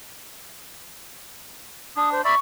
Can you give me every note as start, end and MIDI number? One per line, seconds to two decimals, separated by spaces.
1.97 2.21 62
1.97 2.12 87
2.12 2.24 72
2.25 2.35 74
2.25 2.35 76
2.25 2.35 83
2.25 2.38 85